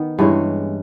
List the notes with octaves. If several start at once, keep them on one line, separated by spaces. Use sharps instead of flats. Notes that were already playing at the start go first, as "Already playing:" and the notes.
Already playing: D#3 B3
G2 E3 G#3 C#4